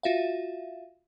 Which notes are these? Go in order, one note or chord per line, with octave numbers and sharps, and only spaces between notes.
F4 F#4 E5 F5